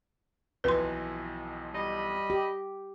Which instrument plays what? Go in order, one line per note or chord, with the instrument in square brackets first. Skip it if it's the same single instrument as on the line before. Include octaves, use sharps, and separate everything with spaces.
[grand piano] B1 F2 E3 [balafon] B4 C6
[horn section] G3 D#5 B5
[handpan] G4